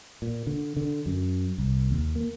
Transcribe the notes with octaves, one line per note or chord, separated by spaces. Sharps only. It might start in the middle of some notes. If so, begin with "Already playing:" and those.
A#2
D3
D3
F#2
C2
D#2
A#3